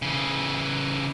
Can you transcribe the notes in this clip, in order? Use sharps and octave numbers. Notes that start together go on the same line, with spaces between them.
C#3 E3